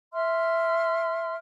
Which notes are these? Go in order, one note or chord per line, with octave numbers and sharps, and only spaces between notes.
E5 C6 F6